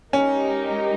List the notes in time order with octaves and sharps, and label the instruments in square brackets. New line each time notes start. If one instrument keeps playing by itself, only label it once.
[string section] G#3 D#4 G4 A#4 [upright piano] C#4